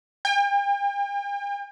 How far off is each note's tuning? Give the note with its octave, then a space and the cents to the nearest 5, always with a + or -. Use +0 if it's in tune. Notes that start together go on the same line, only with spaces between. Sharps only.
G5 +40